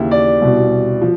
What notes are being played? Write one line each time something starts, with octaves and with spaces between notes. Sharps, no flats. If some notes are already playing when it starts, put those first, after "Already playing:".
Already playing: D#2 C#3 E3 E5
D5
C2 B2
F3